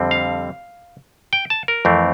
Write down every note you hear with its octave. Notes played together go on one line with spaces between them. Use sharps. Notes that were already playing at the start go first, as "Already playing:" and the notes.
Already playing: F2 D3 G3 C4
F5
G5
A5
A#4
F2 E3 A3 C4